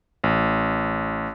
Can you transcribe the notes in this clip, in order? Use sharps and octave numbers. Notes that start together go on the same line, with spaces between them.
A1